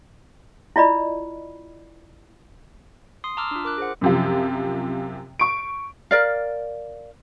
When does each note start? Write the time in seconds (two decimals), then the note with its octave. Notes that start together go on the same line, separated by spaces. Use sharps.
0.76 E4 F4 D5 D#5 B5
3.24 C6 D#6 C7
3.37 A5 A#5 C6 D6 E6 F6
3.51 D4 F4
3.65 A#4 D6 F#6
3.78 G#4 C5 F#5
4.01 F#2 C3 F3
5.39 C#6 D7
6.11 A#4 D5 F5